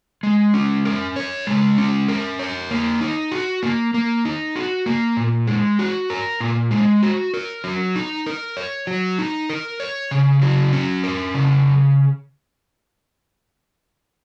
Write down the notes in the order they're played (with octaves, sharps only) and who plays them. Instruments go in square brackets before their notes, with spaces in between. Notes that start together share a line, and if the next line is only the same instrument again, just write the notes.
[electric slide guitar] G#3
C#4
A#4
C#5
G#3
C#4
A#4
C#5
A#3
D#4
F#4
A#3
A#3
D#4
F#4
A#3
A#2
G#3
F#4
A#4
A#2
G#3
F#4
A#4
F#3
D#4
A#4
C#5
F#3
D#4
A#4
C#5
C#3
F#3
C#4
A#4
C#3